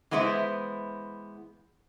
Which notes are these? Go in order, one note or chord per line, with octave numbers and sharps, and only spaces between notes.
E3 G#3 B3 E4 C5